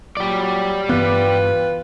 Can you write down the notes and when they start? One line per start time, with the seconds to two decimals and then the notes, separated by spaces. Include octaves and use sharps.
0.17 A#2 F#3 G4 D5
0.89 G2 E3 B3 F4 B4